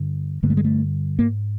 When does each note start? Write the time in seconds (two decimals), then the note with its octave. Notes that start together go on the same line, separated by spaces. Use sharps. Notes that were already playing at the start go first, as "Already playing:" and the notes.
Already playing: G2 D3
0.43 G2 D3 A#3
0.50 A3
0.57 G#3
0.64 A3
1.19 G#2 A#3